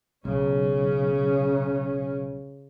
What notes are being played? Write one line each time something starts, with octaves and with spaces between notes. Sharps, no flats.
B1 C#3 C#4